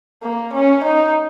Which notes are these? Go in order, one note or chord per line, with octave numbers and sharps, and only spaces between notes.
A#3
C#4
D#4